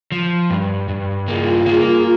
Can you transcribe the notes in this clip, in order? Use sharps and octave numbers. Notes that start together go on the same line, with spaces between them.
F3
G2
G2
A#3 F4 G#4
A#3